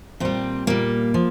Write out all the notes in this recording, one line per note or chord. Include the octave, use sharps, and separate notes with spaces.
A#2 G3 C4
A#2 G3 A#3
F3